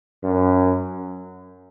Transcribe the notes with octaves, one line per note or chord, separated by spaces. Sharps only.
F#2